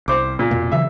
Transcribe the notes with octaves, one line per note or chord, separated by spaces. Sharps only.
C2 C5 D6
A#2
F2 B2 A#3
C#3 E3 F#3 E5